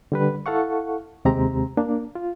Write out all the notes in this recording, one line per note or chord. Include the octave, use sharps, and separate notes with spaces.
D3 G3 B4
E4 A4 F5 F#5 C#6
D#2 C3 G#3 C4 G4 A#5
A#3 D4
F4